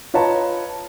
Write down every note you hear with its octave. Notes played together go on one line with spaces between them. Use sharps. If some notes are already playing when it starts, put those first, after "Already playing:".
F4 B4 C#5 D#5 A5 A#5